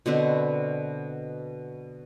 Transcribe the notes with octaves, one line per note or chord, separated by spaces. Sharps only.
B2 D3 C4 B4